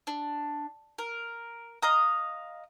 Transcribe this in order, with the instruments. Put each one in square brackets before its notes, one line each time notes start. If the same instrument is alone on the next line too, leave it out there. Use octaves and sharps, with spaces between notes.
[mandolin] D4
A#4
D#5 F5 A#5 D#6